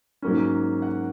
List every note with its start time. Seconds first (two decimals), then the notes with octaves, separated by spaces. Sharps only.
0.22 G#2 F#3 A#3 C#4
0.82 F#5